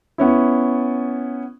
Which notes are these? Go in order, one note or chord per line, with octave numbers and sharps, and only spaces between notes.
B3 C#4 E4